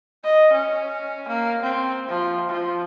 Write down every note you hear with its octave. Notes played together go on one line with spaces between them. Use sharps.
D#5
C#4
A#3
C4
F3
F3